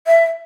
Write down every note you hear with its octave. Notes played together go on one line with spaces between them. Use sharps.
E5